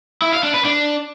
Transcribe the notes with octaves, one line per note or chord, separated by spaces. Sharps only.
E4
F5
D4
B4
D4